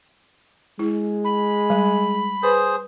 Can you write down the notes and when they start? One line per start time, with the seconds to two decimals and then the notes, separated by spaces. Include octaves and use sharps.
0.79 G#3 E4
1.24 B5
1.70 G3
2.43 G#4 B4 C5